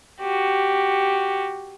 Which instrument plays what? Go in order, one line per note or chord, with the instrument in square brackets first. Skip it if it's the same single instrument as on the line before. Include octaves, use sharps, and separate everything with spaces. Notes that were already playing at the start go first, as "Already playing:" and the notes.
[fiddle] F#4 G4